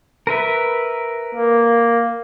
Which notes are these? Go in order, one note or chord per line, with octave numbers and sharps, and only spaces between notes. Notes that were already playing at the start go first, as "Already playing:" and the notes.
A#4 B4 E5
A#3